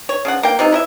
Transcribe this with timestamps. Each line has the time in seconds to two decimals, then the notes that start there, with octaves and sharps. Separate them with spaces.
0.09 C#5
0.25 C#3 F3 F#5
0.43 A#3 G5
0.59 C3 F3 D#4
0.72 E4 D#5 E5